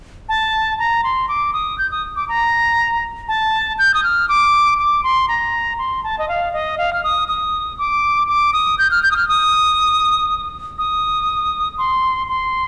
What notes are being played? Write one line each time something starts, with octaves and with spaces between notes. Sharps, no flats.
A5
A#5
C6
D6
D#6
G6
D#6
D6
A#5
A5
G6
D#6
F6
D6
D6
C6
A#5
C6
A5
D#5
F5
D#5
F5
F6
D#6
D#6
D6
D6
D#6
G6
F6
G6
D#6
F6
D#6
D#6
C6
C6